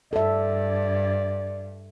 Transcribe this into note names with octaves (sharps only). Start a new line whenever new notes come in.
G2 A4 D5 E5